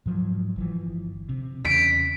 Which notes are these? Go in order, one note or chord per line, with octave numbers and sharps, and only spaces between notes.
G#2 F3 F#3
G1 E3 F3
C3
E2 C#3 B6 D7